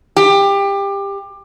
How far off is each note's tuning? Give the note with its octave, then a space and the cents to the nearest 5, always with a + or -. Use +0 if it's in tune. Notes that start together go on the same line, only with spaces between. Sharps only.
G4 +20